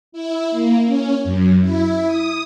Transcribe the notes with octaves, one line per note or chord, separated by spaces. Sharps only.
E4
A#3
C#4
F#2
E4
D#6